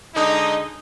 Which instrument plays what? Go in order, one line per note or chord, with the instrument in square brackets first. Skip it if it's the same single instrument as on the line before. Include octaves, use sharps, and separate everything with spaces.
[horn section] D3 G#3 D#4